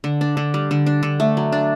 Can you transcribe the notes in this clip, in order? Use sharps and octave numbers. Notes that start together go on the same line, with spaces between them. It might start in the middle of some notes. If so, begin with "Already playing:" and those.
D3
D4
D3
G3
D3
D4
D3
A3
F#3
D4